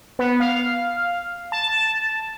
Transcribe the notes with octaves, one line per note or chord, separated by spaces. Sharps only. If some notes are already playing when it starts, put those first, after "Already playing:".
B3
F5
A5